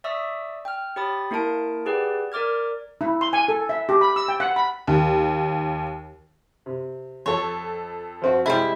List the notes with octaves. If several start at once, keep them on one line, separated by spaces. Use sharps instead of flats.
D5 E5 C#6 D#6 E6 B6
G5 F6
G4 C#5 G5 B5 D#6 A6
A#3 E4 A#4 A5 D7
G4 G#4 B4 D5 F#5 G5
A#4 D5 D6 F6 G#6
E4
C6
G#5
A4
E5
G4
B5
E6
G5
F#5
B5
D#2
C3
F2 A4 C#5
F3 C4 F#4
C3 G3 G#3 E4